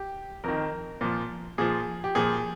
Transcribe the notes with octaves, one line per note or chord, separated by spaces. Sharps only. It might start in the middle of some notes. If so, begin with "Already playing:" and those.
Already playing: G4
F2 D#3 A#4
A#2 F3
A#2 F3 G#4
G4
A#2 F3 G#4